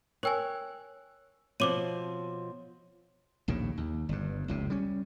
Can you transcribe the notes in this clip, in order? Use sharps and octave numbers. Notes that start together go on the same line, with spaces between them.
A#4 C#5 G5 G#5 E6 F#6
B2 F3 C4 C5 C#5 D6 D#7 F#7
A#1 D#2 A2 C#3
D#2
G1 G2
F1 C#2 C3
G3 C#4